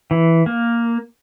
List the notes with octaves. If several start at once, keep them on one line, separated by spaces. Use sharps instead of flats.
E3
A#3